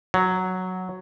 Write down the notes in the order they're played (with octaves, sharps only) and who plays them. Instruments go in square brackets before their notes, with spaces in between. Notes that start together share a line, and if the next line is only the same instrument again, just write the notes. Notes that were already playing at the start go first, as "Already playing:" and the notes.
[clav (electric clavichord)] F#3